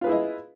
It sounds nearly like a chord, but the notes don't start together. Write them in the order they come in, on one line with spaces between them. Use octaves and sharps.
F4 B4 G#4 E4 D#5